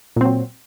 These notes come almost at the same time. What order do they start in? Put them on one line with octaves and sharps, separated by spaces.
A#2 C4 F#3